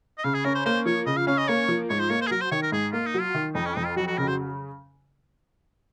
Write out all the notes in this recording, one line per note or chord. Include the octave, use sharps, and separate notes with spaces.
D#5
C#3 F5
G#4
C#4 A#4
C5
A#3 C5
F3 C#5
C#3 D#5
F5
C#4 F5
D#5
A#3 C#5
F3
G#2 C#5
C5
A#3 C#5
C5
G#4
F#3 A#4
C5
D#3 C#5
A#4
G#2 G#4
A#3 F4
D#4
F#3
F4
D#3
F2 D#4
C#4
F2 D#4
F4
F#3 F#4
F#4
C#3 A#4
C5